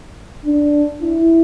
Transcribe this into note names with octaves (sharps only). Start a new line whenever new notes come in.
D4
E4